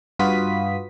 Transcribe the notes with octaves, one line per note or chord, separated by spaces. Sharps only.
G2 F4 F#4 B4 D#6 B6